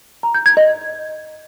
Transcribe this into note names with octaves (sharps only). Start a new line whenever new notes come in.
A#5
G6
G#6
D#5